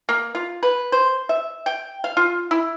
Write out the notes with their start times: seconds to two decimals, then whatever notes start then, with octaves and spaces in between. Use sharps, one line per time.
0.09 A#3
0.35 F4
0.63 B4
0.92 C5
1.29 E5
1.66 G5
2.04 F5
2.17 F4
2.51 E4